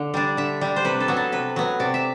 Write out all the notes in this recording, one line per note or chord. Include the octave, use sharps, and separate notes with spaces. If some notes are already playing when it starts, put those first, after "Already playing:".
Already playing: D3
G3 D4
D3 E5
G3 D4
C5
C3 B4
A4
F#3 B3
A4
C3 B4
F#3 B3
C3 D5
E5